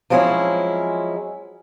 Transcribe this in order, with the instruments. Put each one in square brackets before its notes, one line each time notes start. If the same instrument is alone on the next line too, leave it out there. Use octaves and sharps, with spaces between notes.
[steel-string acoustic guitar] F3 F#3 G#3 C4 C#4 E4